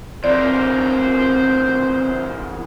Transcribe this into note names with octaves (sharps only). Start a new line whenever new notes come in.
E2 A#3 C4 C5 D5